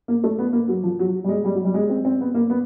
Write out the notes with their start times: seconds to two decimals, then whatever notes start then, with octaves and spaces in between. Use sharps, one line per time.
0.08 A#3
0.24 A3
0.38 B3
0.53 A#3
0.68 F#3
0.83 F3
0.99 F#3
1.24 G3
1.28 G#3
1.45 G3
1.55 F#3
1.65 G3
1.74 G#3
1.89 C4
2.05 C4
2.21 B3
2.35 A#3
2.50 B3